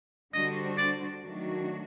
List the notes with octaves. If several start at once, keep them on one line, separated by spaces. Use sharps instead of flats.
D3 G3 D4 F#4 C5 D#5
D5
D#3 F#3 A3 D4 F#4